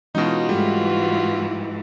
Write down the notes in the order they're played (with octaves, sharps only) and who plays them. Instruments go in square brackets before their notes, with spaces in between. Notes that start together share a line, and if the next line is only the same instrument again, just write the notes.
[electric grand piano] B2 D#4 [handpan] E3 G#3 C#4 [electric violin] F4 F#4
[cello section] G#2 E3 [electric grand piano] G3 [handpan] A3